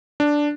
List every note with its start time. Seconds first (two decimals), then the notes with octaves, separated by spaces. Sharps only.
0.20 D4